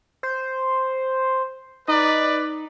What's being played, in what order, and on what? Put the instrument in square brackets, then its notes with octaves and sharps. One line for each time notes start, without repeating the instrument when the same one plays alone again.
[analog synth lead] C5
[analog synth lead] D#4 [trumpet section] B4 D5